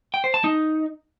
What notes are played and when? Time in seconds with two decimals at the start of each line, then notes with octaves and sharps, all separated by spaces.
0.14 G5
0.24 C5
0.34 A5
0.44 D#4